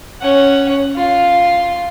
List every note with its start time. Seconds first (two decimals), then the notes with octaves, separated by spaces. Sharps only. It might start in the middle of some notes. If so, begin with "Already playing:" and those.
0.21 C#4 F#5
0.96 F4 C6